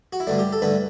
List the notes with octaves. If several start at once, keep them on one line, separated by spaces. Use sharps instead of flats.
F#4
E4
G2 D3 A3 D4
G4
A4
G2 D3 A3 B4